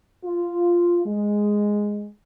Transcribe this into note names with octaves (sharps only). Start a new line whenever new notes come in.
F4
G#3